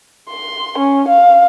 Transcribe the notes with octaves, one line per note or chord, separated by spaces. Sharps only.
C6
C#4
F5